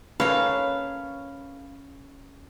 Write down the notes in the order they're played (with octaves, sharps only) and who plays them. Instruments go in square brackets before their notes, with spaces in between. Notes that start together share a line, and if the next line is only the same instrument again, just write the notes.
[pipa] A#3 B4 [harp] C#4 A4 [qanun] F5